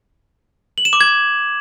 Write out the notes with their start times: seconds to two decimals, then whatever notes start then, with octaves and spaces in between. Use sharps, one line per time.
0.78 F#7
0.85 E7
0.93 D6
1.01 G#6